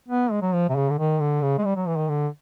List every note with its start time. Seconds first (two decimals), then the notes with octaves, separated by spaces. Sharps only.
0.09 B3
0.31 G#3
0.42 F#3
0.54 F3
0.69 C3
0.76 C#3
0.90 D3
0.99 D#3
1.20 D3
1.42 C#3
1.58 G#3
1.65 G3
1.76 F#3
1.87 E3
1.98 D#3
2.09 D3